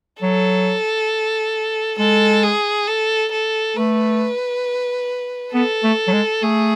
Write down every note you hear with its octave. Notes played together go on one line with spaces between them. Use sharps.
F#3 A4
G#3 A4
G#4
A4
A4
A3 B4
B3 A4
A3
F#3
G#3
A3 G#4